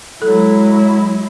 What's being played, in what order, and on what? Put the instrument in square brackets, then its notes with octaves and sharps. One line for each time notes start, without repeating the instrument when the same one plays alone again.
[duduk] F#3 [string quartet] G#3 E4 [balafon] A4